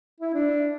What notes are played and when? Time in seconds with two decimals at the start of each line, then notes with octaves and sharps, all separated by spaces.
0.20 E4
0.34 D4